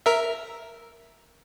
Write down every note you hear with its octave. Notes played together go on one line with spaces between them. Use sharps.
A#4 E5